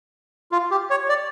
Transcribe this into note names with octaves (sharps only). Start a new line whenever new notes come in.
F4
G4
C#5
D5